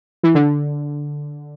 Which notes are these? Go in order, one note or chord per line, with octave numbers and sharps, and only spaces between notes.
E3
D3